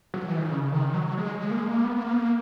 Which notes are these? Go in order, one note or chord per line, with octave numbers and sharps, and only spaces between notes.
F#3
E3
D#3
C#3
D#3
F#3
G#3
A#3
G#3
A#3
B3
A#3
B3
A#3